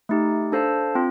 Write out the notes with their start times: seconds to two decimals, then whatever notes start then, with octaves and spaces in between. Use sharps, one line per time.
0.09 A3 D#4 G4
0.52 D4 A4 C5 F5 A5
0.95 C4 F4